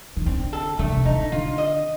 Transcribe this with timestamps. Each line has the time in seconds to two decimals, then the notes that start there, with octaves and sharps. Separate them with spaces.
0.17 D#3
0.26 D3 C4
0.53 A4
0.79 D3 A3
0.92 C3
1.05 D3 D#4
1.32 D3 F4
1.58 D#5